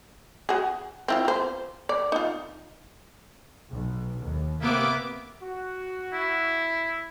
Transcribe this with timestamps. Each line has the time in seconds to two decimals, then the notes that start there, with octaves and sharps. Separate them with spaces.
0.49 F#4 G#4
1.08 C4 E4 F4
1.25 F4 C5
1.89 D5
2.12 D#4 F4
3.71 B1
4.22 D#2
4.62 C3 A#3 B3 E5 D6
5.43 F#4
6.13 E4